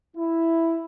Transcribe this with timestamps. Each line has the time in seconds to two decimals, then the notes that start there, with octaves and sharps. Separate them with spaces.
0.16 E4